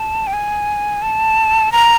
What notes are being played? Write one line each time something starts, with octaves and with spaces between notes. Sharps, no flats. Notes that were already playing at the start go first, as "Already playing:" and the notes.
Already playing: A5
G5
G#5
A5
A#5